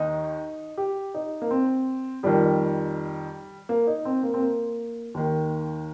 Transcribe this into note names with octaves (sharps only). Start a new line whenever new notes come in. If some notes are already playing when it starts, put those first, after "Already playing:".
Already playing: D#2 D#3 D#4
G4
D#4
A#3
C4
F2 D#3 G3
A#3
D#4
C4
A#3
C4
A#3
D#2 D#3